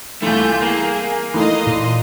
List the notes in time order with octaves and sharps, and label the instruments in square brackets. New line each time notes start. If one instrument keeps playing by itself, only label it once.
[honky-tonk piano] C2 E3 [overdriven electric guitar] A3 [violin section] F4 G#5 G6
[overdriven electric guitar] A#3 [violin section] G#4
[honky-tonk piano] E3 A3 D#4 [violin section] D#5 F5 C6
[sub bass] A#2